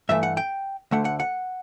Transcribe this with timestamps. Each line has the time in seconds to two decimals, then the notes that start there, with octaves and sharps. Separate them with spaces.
0.09 G2 E3 A3 E5
0.23 F#5
0.37 G5
0.91 D2 D3 A3 F#5
1.05 F#5
1.20 F#5